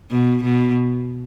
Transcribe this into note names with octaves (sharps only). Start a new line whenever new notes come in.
B2
B2